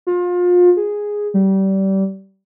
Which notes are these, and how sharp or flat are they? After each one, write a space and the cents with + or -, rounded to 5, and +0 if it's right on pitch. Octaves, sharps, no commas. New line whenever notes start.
F4 +30
G#4 -5
G3 -25